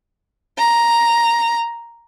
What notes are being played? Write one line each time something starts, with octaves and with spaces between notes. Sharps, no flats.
A#5